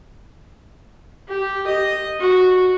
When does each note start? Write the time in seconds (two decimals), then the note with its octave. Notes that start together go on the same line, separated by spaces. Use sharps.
1.29 G4
1.68 D#5
2.21 F#4